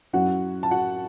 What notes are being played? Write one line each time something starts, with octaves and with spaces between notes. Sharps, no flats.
F#2 F#3 C#4 E4 F#4 F#5
A5
F#4 F#5